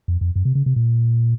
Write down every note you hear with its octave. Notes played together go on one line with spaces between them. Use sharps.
F2
F2
F#2
C3
C#3
C3
A#2